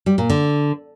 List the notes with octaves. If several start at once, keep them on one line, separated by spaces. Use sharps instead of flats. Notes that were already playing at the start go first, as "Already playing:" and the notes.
G3
A#2
D3